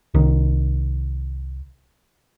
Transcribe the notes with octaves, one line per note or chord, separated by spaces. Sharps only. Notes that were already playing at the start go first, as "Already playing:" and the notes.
C2 D#3